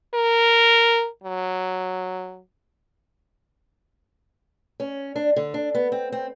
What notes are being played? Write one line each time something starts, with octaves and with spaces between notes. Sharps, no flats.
A#4
F#3
C#4
D4
D3
D4
B3
C4
C4